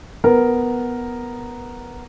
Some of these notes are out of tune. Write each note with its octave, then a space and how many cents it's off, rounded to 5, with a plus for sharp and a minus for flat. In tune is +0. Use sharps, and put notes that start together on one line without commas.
B3 +0 A#4 +0